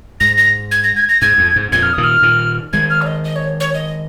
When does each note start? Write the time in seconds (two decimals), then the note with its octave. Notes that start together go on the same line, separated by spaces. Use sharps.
0.20 G#2 A#6
0.37 A#6
0.71 G#6
0.84 A#6
0.96 G#6
1.09 A#6
1.21 G#2 G#6
1.38 F2
1.56 G#2
1.72 F2 A#2 G#6
1.83 F6
1.93 A#2 D#3 D#6
2.03 F6
2.22 A#2 D#3
2.73 D#3 G#3 G#6
2.90 F6
3.02 C#5
3.07 D#5
3.24 D#5
3.36 C#5
3.60 C#5
3.74 D#5